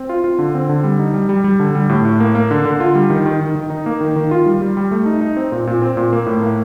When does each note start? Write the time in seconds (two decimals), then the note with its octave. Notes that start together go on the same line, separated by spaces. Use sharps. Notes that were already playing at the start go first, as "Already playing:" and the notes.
Already playing: C4
0.09 F4
0.24 F4
0.39 D3
0.55 C4
0.69 D3
0.84 G3
0.99 D#4
1.14 G3
1.29 G3
1.44 G3
1.60 D3
1.75 G3
1.89 A2
2.05 A2
2.20 A#3
2.35 A#3
2.51 D3
2.65 D3
2.80 F4
2.95 G3
3.10 D#3
3.26 D#3
3.41 D#3
3.55 D#3
3.70 D#4
3.86 A#3
4.01 D#3
4.16 D#3
4.31 F4
4.46 G3
4.61 G3
4.77 G3
4.91 A3
5.06 D#4
5.21 D#4
5.37 C4
5.52 A#2
5.67 A#2
5.82 C4
5.97 A#2
6.13 A#3
6.26 A2
6.42 A#3